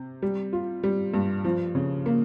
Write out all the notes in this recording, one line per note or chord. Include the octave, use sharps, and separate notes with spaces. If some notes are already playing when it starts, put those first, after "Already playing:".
Already playing: C3
G3
F4
G3
G2
F3
C#3
A#3